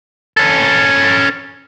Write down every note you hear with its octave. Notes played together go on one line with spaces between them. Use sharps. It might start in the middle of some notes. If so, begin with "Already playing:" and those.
C#4 A4